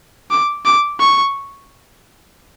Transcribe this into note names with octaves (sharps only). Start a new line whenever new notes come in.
D6
D6
C#6